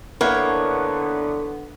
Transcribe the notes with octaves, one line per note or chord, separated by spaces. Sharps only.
D3 A#3 B3 E4 B4 C#5 F#5